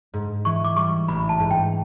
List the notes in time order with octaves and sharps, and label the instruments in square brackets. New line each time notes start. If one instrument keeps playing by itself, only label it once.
[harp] G#2
[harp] E3 [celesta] C#6
[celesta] D6
[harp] G3 [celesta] C#6
[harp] A1 [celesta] B5
[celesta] A5
[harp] G#2
[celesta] G5